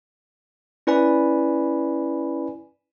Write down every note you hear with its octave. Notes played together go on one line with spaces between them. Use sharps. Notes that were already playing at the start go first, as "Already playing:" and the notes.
C#4 E4 B4 D5 G#5 B5